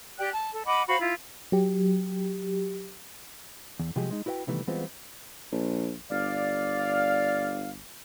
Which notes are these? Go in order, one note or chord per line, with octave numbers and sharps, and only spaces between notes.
G4 D5 G5 F#6
A5
A4
D#5 F#5 B5 D6
F#4 C5 F5 B5
E4 F4
F#3 G4
E2
C3 F3 F#3 G#3 G4 G#4
G#3 D#4
E4 F#4 B4 E5 G5
C3 D#3 E3 G3 A3 B3
E3 G3 G#3 B3 C4 F4
A#1
G1 D5 F5